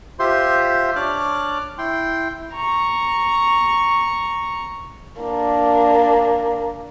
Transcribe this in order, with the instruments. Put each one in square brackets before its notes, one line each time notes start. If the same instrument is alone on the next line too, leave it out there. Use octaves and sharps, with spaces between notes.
[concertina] F4 G4 C5 E5 C6
D4 C#5 D5 D6 F6 F#6
E4 G5 C6
[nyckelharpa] A#5 C#6
[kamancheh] A#3 D4